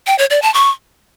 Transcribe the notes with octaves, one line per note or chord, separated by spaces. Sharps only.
G5
C#5
D5
A5
C#6